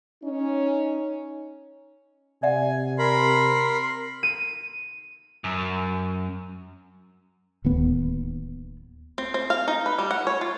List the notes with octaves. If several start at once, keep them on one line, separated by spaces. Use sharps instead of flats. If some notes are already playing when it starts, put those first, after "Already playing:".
C#4 D#4
C3 D5 E5 F#5 G#5
A#4 B5 C6
D#7
F#2
D1 D#2 B3
C4
C4
F5
D#4
B4
G3
F#5
C#5
F4